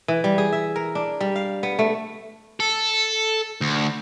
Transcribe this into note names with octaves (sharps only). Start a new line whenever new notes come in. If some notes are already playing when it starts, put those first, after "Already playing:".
E3
G3
G#4
E5
A#4
D4
G3
F5
B3
A3
A4
D2